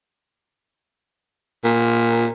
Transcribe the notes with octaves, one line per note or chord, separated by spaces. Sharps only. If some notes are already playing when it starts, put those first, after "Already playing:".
A#2